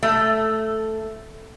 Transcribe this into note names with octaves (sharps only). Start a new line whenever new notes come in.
A3